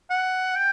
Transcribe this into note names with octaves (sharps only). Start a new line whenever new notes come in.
F#5
G5